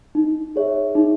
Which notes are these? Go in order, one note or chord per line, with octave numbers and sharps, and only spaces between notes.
D#4
G#4 C#5 E5
D#4